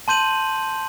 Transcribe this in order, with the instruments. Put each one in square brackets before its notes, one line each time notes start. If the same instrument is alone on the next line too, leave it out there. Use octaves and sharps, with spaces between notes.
[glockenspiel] A5 C6 G6 D#7 F#7